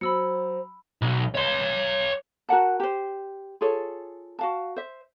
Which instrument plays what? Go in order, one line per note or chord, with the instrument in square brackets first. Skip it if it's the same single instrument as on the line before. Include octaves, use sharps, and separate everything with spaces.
[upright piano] F#3 [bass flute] C5 [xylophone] B5 E6 C#7
[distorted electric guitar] B1
C#5 C6
[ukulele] F#4 A#4 F#5 A5
G4 C5
F4 G#4 A4 C#5
F#4 F5 A5
C5 E5